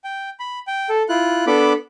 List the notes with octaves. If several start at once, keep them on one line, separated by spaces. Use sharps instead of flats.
G5
B5
G5
A4
E4 F4 F#6
B3 D4 A4 B5 D6